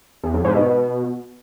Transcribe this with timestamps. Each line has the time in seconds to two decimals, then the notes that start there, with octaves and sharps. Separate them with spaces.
0.23 E2
0.34 F2
0.45 G#2
0.55 B2